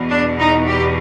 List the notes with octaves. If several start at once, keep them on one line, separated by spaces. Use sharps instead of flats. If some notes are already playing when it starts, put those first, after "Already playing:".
Already playing: E2 B2
D4
D#4
G4